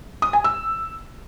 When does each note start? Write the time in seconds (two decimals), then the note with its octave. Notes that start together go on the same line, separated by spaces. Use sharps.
0.22 D#6
0.33 G#5
0.44 E6